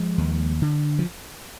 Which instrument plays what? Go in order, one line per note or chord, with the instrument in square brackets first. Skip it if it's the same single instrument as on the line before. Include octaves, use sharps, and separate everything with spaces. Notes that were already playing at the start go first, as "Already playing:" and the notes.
Already playing: [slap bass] F3 G#3
D#2
D3
F3